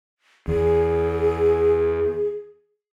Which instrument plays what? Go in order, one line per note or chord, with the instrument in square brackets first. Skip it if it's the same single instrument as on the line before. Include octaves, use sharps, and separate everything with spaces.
[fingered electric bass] E2 [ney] G#4